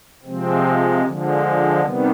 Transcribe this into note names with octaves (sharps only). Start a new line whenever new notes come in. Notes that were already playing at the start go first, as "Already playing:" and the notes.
C3 F3 G#3 C4
D3 F3 G#3
C3 D#3 G3 B3